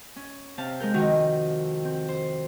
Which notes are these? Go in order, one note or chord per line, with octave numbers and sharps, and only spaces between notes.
C#4
C3 C4 F5 A5
G#3 C4 A#4 G6
F2 D#3 C4 D#4 F#4 A#4
C4
C5